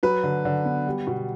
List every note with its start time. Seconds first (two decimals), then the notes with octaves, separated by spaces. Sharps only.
0.03 F#3 B4
0.24 D3
0.45 D3
0.65 B3
0.87 G3
1.07 B2